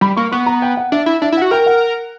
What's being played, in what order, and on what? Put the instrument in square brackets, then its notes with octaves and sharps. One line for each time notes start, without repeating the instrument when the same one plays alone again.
[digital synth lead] G3 [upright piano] B5
[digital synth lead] A#3 [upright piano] C#6
[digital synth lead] B3 [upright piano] C#6
[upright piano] A#5
G5
F#5
[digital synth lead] D4 [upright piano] E5
[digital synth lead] E4
[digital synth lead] D4 [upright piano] E5
[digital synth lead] E4
[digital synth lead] F#4 [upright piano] F#5
[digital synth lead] A#4 [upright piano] G5
[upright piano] F#5